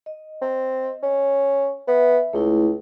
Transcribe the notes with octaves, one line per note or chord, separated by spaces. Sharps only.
D#5
C4
C#4
B3 E5
C#2 A3 E4